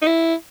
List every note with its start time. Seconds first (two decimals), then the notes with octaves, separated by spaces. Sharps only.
0.02 D#4
0.06 E4